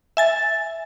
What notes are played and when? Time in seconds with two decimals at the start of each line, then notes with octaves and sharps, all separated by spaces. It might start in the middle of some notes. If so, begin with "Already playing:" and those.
0.17 E5 G#5 A6